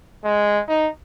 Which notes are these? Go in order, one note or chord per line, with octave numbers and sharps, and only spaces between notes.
G#3
D#4